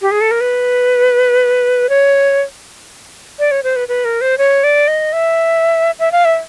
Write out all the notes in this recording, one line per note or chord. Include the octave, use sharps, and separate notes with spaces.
G4
G#4
A4
A#4
B4
C#5
D5
C#5
C5
B4
B4
A#4
C5
C#5
D5
D#5
E5
E5
F5
E5